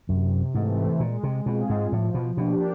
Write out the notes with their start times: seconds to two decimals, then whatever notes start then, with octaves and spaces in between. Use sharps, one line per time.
0.09 F#2 C3
0.55 G#2 E3 A3 C4
1.00 A#2 G#3
1.23 C3
1.46 B2 C4 F4 G#4
1.70 G#2
1.92 A2 F3
2.14 B2
2.37 B2 A#3 D4 G4